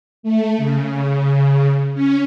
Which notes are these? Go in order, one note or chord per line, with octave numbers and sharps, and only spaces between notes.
A3
C#3
C#4